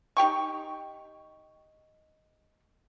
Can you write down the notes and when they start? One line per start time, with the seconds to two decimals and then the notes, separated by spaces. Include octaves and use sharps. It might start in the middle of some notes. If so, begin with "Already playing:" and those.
0.17 D#4 G4 G5 C#6